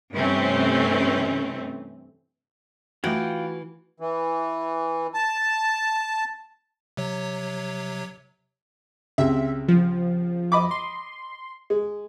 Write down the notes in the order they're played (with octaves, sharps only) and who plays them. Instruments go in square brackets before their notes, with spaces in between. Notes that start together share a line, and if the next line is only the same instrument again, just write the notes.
[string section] G2 C3 E3 A3 C4 C#4
[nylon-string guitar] E3 [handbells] A3 G#6 [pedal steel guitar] F4 F#5 G5 [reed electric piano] F#4
[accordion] E3
A5
[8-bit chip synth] C3 F#3 C#5
[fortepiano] C#2 C3 [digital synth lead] E5
[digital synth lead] F3
[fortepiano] D#5 B5 D6
[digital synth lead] C6
[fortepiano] G#3